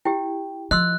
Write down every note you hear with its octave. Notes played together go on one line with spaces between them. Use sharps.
E4 G4 G5
F3 D#5 C6 E6 F#6